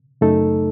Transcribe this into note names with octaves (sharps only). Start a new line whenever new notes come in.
F#2 C#3 A3 D#4 A4